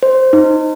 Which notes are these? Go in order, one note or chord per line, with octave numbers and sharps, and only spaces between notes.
C5
D#4